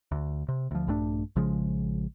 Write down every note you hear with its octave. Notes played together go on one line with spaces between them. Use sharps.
D2
C3
D2 F3
A#1 G2 A3 D4
A#1 C#3 F3 G#3